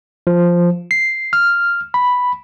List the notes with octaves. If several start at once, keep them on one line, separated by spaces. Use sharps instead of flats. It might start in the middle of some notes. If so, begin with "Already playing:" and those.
F3
C7
F6
B5